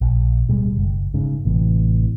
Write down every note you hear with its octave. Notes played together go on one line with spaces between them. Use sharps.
A#1
D1 B2 G3 G#3
F#1
G#2 C#3
A1 C3 E3